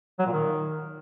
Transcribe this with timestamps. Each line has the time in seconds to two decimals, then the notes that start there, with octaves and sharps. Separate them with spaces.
0.19 F#3
0.26 A#2
0.33 D#3